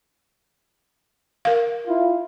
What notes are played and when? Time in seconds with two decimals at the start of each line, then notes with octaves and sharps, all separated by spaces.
1.45 A#4 F5
1.88 E4 F4